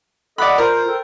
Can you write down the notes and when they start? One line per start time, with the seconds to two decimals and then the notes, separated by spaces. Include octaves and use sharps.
0.38 A4 D5 D#5 F#5 B5
0.58 F4 A#4 C5
0.87 A4 C5 G5